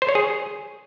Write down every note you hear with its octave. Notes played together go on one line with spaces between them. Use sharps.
C5
C#5
G#4